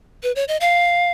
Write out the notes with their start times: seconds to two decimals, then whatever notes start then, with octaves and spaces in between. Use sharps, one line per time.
0.23 B4
0.36 C#5
0.48 D#5
0.60 F5